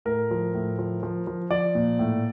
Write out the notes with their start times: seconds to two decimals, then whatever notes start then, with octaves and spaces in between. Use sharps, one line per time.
0.05 A2 A#4
0.31 F3
0.54 A2
0.79 F3
1.03 F3
1.27 F3
1.50 F3 D5
1.75 A#2
1.99 A2